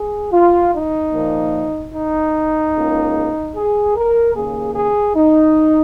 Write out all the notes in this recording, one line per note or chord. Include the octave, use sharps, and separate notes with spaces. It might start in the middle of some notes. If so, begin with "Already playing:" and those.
Already playing: G#4
F4
D#4
A#2 F3 A#3
D#4
C#2 C#3 A#3
G#4
A#4
D#2 C#3 A#3 G#4
G#4
D#4